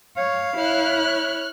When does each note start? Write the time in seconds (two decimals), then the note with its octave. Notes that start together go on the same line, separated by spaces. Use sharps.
0.17 C#5 F5
0.57 E4 C#5 F6 F#6